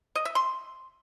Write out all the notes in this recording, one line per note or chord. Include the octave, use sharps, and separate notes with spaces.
D#5
E5
C6